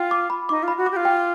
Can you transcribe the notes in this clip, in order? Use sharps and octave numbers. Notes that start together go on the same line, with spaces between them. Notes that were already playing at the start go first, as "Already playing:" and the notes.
Already playing: F4 G5
D6
B5
D#4 D6
F4 B5
F#4
D6
G4
F4
G5